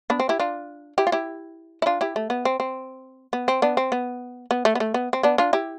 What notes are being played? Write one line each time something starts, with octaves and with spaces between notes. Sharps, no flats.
B3 D4
C4
E4 G4
D4 F4
E4 G4
F4
E4 G4
E4
D4 F4
E4 G4
A3
B3
C4
C4
B3
C4
B3 D4
C4
B3
B3
A3
B3
A3
B3
C4
B3 D4
D4 F4
E4 G4